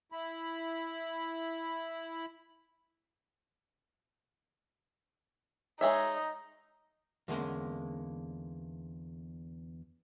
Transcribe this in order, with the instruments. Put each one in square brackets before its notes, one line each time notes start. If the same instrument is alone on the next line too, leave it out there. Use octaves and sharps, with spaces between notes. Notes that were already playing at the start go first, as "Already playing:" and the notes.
[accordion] E4 B5
[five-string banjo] G#3 C#5 E5 [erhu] D#4
[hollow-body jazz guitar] E2 D3 G#3 A#3 C#4